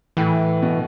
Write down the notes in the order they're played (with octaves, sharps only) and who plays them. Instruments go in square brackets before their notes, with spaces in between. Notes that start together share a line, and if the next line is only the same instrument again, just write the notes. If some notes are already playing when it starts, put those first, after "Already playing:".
[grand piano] A2 [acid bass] E3
[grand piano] B2